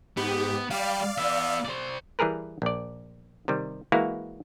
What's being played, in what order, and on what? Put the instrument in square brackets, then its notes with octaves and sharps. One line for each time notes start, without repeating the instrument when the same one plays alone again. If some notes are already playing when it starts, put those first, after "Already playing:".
[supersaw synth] G#2 G4 [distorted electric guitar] B3
[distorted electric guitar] G3 [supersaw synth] D5 F5
[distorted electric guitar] B3 E5
C5 D5
[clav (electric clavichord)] E3 G3 G#4 A#4 B4
A#1 D5
C3 D#3 G3
E3 G#3 A#3 E4 F#4 F5